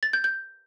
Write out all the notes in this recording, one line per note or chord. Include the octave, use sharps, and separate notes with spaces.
A6
G6
G6